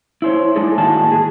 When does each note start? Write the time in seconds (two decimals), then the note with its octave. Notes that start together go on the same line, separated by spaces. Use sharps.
0.22 E4 C5 C#5
0.56 G#3 A3 D4 D#4 G#4 A4
0.78 A2 D#3 G#3 A#3 F#4 A5
1.12 G#4